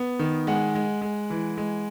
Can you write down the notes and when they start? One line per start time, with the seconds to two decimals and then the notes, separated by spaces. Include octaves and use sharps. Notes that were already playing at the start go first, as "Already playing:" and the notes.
Already playing: B3
0.19 D#3
0.47 G#3 F#5
0.75 G#3
1.02 G#3
1.30 E3
1.58 G#3